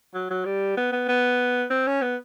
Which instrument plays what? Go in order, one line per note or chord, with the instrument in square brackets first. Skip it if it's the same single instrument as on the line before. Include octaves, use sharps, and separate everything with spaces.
[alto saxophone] F#3
F#3
G3
B3
B3
B3
C4
C#4
B3